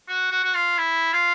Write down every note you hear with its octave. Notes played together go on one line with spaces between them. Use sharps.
F#4
F#4
F#4
F4
E4
F4